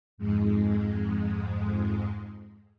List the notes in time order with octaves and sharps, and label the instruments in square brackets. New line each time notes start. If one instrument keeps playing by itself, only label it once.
[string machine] F2 G#2 G#3